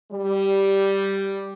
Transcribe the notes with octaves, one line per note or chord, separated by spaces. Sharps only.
G3